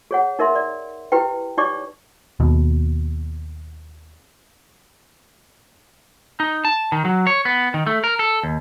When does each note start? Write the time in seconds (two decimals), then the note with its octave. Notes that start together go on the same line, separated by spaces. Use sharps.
0.11 G#4 C#5 F#5
0.39 D#4 A#4 E5 C6
0.55 D5
1.12 E4 G4 B4 G5
1.57 D#4 G4 C#5 D5 C#6 D6
2.40 D#2 B2
6.40 D#4
6.65 A5
6.92 D#3
7.05 F#3
7.27 C#5
7.45 B3
7.74 D#3
7.87 A3
8.04 A#4
8.19 A4
8.43 D#2